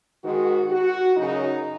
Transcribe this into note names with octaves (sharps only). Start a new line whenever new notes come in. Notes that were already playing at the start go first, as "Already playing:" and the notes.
G#2 D#3 F#4
F#4
F#2 C#3 D#4